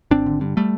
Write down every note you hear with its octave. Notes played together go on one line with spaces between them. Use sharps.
G#1 C4 D4
D3
G2
G3 A3